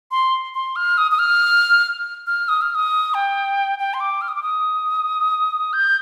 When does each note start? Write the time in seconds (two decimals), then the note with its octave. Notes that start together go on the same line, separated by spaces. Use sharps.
0.11 C6
0.54 C6
0.76 F6
0.98 D#6
1.12 D#6
1.19 F6
2.27 F6
2.49 D#6
2.61 F6
2.75 D#6
3.14 G5
3.79 G5
3.94 C6
4.00 D6
4.21 F6
4.28 D#6
4.35 D6
4.43 D#6
5.73 G6